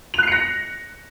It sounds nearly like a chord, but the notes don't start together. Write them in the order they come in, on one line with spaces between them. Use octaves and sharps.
F7 F#6 C7 C#7 A#6